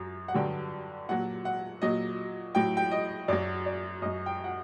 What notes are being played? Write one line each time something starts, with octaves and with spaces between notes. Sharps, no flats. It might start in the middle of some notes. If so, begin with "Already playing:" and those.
Already playing: F#2 F#3
F#5
G2 D3 F#3 G5
A#2 F#3 F#5
F#5
A#2 F#3 D#5
A2 F#3 G5
G5
D#5
F#2 F#3 D5
D5
F#2 F#3 D#5
G5
F#5